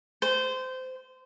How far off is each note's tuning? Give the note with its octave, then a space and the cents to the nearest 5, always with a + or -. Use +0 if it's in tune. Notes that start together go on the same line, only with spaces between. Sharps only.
C5 -20